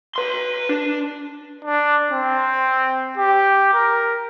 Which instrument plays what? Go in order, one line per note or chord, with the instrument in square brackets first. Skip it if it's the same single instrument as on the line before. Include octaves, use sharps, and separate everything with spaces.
[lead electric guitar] B4 C6
D4
[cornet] D4
C4
G4
A#4